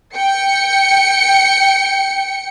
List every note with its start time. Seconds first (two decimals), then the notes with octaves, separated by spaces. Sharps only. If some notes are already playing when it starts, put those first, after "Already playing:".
0.15 G5 C#7